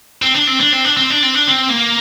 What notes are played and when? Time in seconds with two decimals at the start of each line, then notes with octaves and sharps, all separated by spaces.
0.22 C4
0.34 D4
0.47 C4
0.60 D4
0.72 C4
0.84 D4
0.97 C4
1.10 D4
1.23 C4
1.35 D4
1.48 C4
1.69 A#3